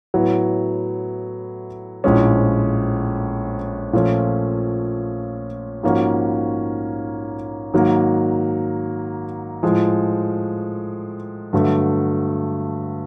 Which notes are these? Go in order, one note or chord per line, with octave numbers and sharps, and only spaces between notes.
A2 F#3 B3 E4
A#1 A2 F3 G#3 C#4
A#2 F3 A3 C#4
G#2 F3 A#3 C#4 F#4
G#2 D#3 F#3 A#3
A2 F3 G#3
G2 D3 F#3 A3